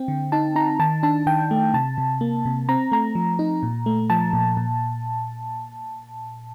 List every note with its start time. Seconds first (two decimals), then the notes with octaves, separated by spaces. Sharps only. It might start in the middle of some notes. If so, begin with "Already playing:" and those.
Already playing: C4 G5
0.08 D3
0.32 D#4 A5
0.56 D#4 A#5
0.79 D#3 A5
1.03 D4 A5
1.27 D#3 G5
1.51 A3
1.74 C3 A5
1.98 C3
2.21 A#3
2.45 C3
2.69 C4 A#5
2.92 A3 A#5
3.15 F3
3.39 D#4
3.63 A#2
3.86 A3
4.10 F3 A5
4.33 A#2
4.57 A#2